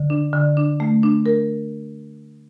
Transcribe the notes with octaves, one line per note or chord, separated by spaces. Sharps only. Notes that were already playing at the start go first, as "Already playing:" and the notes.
Already playing: D3
D4
D3
D4
A3
D4
A#4